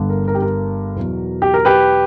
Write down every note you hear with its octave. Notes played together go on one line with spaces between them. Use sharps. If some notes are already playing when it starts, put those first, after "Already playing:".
Already playing: G1 G2 D3
A#4
A#4
G4
A#4
E2 B2 F#3
G4
A#4
G4 B4